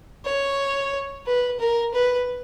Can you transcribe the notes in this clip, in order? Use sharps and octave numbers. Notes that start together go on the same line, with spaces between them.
C#5
B4
A#4
B4